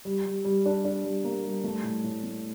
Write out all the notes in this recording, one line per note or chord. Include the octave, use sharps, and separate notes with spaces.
G3
G3
G3
D4
D4
G3
A#3
G3
A3
A2
A2
A3